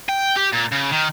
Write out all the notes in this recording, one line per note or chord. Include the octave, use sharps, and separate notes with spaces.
G5
G4
A#2
C#3
D#3